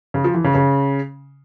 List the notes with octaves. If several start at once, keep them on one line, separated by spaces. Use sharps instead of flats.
C#3
F3
E3
C#3
C#3